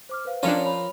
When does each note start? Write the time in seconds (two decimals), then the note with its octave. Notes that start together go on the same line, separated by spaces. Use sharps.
0.09 C5 D6 F6
0.25 B4 C5 F5
0.43 F3 C#4 D4 F4 A#4 C6 C#7
0.66 C#5 B5 F7